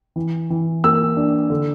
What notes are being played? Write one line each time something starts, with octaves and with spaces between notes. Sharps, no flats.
E3
E3
A#3 E6
D4
D3